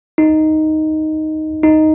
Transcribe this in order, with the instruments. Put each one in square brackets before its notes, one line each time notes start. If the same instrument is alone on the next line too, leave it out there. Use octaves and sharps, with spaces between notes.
[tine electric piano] D#4
D#4